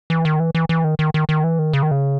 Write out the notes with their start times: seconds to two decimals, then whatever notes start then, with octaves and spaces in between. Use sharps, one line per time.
0.10 E3
0.25 D#3
0.40 E3
0.55 E3
0.69 E3
0.84 D#3
0.99 D#3
1.14 D#3
1.29 D#3
1.44 E3
1.59 D#3
1.73 C#3
1.83 D#3
1.91 C#3